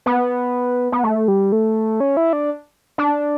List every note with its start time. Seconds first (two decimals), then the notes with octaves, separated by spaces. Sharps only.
0.06 B3
0.92 B3
1.04 A3
1.28 G3
1.52 A3
2.00 C#4
2.17 E4
2.33 D4
2.98 D4